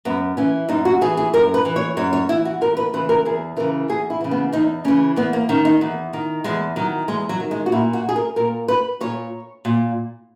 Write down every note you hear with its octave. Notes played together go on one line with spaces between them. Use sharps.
F#2 B3
E3 C#4
F#2 D#4
F#4
E3 G#4
G#4
F#2 A#4
B4
E3
C#5
F#2 C#5
C#5
E3 E4
F#4
E2 A#4
B4
C#3 E3 B4
A#4
E2 G#4
C#3 E3 A#4
E2 G#4
E4
C#3 E3
B3
E2 D#4
C#3 E3 C#4
E2 B3
A#3
D#3 C#4
D#4
E2
D#3
E2 G#3
D#3 F#3
E2 G#3
F#3
D#3
G#3
F#4
A#2 E4
F#4
G#4
A#4
A#2 A#4
B4
A#2 C#5
A#2